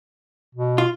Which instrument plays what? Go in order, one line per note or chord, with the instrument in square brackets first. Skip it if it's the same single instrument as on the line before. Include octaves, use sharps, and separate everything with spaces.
[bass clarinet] B2
[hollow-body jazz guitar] F4